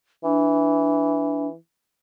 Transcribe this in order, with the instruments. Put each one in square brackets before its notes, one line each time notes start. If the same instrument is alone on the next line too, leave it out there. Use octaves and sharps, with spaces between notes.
[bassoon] E3 [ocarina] D4